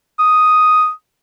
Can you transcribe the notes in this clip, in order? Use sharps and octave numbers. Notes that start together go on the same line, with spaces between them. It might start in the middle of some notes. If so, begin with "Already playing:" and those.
D#6